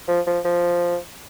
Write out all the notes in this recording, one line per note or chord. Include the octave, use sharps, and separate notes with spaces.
F3
F3
F3